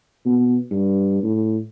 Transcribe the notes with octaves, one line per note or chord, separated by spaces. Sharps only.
B2
G2
A2